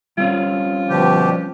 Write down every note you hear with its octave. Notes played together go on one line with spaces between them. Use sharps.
G3 C4 C#4 F4
B2 D3 F3 G4